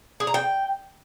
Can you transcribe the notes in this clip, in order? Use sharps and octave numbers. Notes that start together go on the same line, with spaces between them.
G#4
A#5
G5